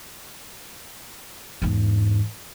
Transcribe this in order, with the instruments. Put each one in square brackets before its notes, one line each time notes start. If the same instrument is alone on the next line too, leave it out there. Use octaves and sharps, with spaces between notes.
[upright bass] E2 G#2